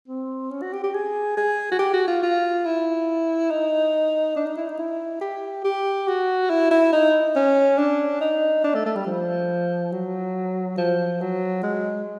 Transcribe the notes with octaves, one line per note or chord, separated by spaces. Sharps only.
C4
C#4
F#4
G4
G4
G#4
G#4
F#4
G4
F#4
F4
F4
E4
D#4
D4
D#4
E4
D#4
E4
G4
G4
F#4
E4
E4
D#4
C#4
D4
D#4
D4
A3
A3
G3
F3
F#3
F3
F#3
G#3